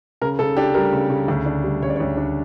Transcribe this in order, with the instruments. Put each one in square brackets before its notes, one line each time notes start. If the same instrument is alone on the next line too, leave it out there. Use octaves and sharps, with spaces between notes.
[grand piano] C#3 A#4
C#3 A4
D4 G4
G3 A#4
C#3
C#3
D2
D4
G3
C#3 C#5
D5
D2 C#5
D4